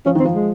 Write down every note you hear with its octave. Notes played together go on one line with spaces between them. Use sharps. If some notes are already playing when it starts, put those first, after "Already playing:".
F3 C#4
D#3
C4
F3
G#3